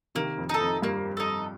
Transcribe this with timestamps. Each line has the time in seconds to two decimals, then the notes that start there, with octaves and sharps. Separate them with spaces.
0.15 C3 D#3 A#3
0.38 F2
0.49 D#4 A4
0.61 F2
0.82 G2 A#3
1.17 D#4 A4